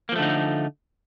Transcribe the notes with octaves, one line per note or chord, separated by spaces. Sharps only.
D3 F3 A3 A#3 D#4